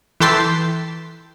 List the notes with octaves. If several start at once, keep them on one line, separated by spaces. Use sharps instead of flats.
E3 A4 G5 A5 C6 B6